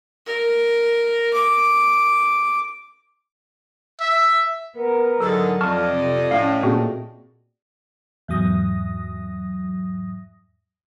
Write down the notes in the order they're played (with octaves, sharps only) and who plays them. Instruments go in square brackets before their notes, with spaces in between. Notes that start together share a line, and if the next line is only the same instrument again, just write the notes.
[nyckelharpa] A#4
D6
[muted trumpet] E5
[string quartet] B3 [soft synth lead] A#4
[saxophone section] G#2 D3 [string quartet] F#3 D#5 A6 [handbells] A4
[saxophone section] F2 [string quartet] D5 D#5 [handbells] A5 C#6 F6
[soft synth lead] C3
[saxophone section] A2 [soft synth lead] C#4 [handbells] F5
[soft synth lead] A#2 [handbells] C4 F#4 G#4
[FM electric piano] E2 G#2 F#3 D#6 A#6